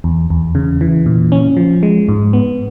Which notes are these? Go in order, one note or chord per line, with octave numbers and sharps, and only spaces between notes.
E2
E2
C#3
E3
A#2
C#4
F3
G#3
G#2
B3